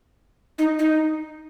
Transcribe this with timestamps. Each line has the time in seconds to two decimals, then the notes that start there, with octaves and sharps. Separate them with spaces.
0.58 D#4
0.79 D#4